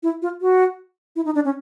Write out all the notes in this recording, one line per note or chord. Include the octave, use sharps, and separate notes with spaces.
E4
F4
F#4
E4
D#4
D4
C#4